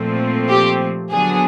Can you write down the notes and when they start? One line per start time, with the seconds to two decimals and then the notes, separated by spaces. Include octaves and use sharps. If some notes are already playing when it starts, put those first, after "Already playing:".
Already playing: A#2 F3 A3 C4
0.49 G4
1.11 D3 F#3 B3 D4 G#4